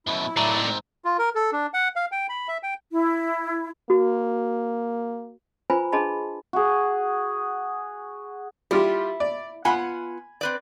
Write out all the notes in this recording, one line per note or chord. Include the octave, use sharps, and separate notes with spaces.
F#2 B2 E4
A2 F#3 A3 D5 A#5
G#2 C4
F4
A#4
A4
D4
F#5
F5
G5
B5
E5
G5
E4
A#3 F#4
F4 B4 C5 G#5 A#5 B5
D4 G#4 D#5 A5 B5 C6
F#4 G#4
G3 E4 F4 G4
D5
B3 F4 F#5 G#5 B5
C4 B4 D5